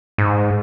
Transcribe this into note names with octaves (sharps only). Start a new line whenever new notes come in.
G#2